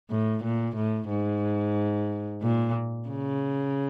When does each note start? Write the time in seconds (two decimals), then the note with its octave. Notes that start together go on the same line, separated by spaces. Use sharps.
0.10 A2
0.44 A#2
0.76 A2
1.10 G#2
2.42 A#2
3.09 C#3